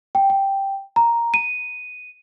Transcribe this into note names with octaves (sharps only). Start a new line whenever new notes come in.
G5
G5
A#5
D#7